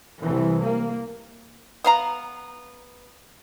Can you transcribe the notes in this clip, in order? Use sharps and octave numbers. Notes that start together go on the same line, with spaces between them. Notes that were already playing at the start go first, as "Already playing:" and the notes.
C2 E3
A#3
B3 F5 A#5